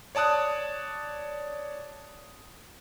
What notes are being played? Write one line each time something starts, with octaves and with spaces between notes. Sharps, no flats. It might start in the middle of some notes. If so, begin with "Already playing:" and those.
C#5 D5 A5 D#6 F#6